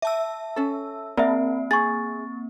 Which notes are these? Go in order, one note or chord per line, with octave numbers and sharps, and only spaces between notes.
E5 A5 E6
C#4 A4
A#3 C4 A#4 D5 E5
G#4 C#6 A6